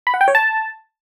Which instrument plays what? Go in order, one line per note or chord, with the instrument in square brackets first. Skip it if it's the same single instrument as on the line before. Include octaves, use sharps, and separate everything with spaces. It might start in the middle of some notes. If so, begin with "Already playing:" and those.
[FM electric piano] B5
F#5
G5
C#5
A5